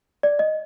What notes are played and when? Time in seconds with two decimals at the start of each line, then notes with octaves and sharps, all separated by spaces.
0.23 D5
0.39 D#5